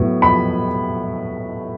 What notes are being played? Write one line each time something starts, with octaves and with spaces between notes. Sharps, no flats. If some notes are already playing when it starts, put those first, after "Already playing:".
Already playing: A2 F#3 B3
B5